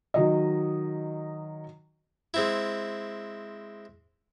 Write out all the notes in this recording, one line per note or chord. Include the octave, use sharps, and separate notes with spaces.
D#3 F#3 D#5
G#3 C4 E4